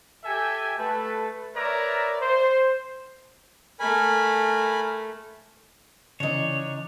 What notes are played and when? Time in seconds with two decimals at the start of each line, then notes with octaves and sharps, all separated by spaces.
0.24 G4 A4 E5 G5 G#5
0.79 A3 A4 B4
1.55 A#4 B4 C#5 D5 E5 A#5
2.21 C5
3.80 A3 A#4 G#5 B5
6.20 C#3 E3 D4 D#4 C#5